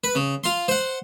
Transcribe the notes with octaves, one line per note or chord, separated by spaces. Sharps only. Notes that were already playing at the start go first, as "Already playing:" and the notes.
B4
C#3
F4 C6
C5 F#5